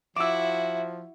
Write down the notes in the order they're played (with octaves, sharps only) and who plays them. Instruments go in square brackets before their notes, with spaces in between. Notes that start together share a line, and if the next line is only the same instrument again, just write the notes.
[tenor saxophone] F3 [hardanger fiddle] E4 F#4 [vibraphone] E5 [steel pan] D6 E6